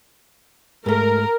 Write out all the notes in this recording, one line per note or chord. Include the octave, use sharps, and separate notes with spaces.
G#2 A3 A#4